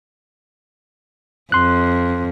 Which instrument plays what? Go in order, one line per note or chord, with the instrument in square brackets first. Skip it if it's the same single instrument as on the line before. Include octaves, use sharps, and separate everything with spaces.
[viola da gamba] F2 [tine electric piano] C6 F#6